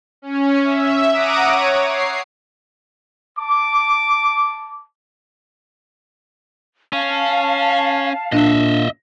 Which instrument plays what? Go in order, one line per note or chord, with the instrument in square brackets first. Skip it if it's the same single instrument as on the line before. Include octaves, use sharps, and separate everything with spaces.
[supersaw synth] C#4
E5
F#5 A#5 D6 D#6 D7 D#7
C#5
C7
[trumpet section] A5 D6
[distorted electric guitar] C#4 [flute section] F5 A5
[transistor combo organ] A#2 [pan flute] D4 [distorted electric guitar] D#5 E5